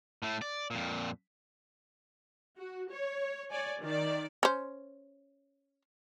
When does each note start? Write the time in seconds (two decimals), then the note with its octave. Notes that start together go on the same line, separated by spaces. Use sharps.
0.23 A2 A3
0.42 D5
0.71 F2 A#2
2.58 F#4
2.91 C#5
3.50 C#5 D5 G#5
3.80 D#3 D5
4.43 C#4 C5